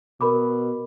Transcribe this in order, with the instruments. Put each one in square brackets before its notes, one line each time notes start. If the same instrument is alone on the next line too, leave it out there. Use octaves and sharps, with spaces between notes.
[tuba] B2 [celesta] A#4 B5 D6